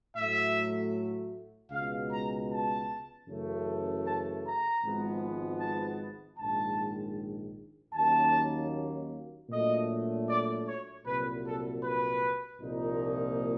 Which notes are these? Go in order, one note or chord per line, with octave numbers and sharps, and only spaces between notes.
A2 F#3 A3 E5
C#2 B2 G#3 B3 F5
A#5
A5
F#2 C#3 E3 A3
A5
A#5
G#1 G#2 F3 G#3 B3
A5
A#1 G#2 D#3 G#3 A5
D#2 D#3 F#3 A#3 C#4 A5
A#2 F#3 A3 D4 D#5
D5
C#5
C2 A#2 F#3 B4
A4
B4
C2 A#2 F3 A#3 D#4